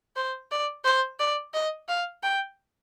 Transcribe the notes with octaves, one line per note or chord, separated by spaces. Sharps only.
C5
D5
C5
D5
D#5
F5
G5